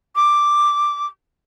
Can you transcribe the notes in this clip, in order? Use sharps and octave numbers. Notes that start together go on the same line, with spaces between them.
D6